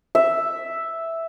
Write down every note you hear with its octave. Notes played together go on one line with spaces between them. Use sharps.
E5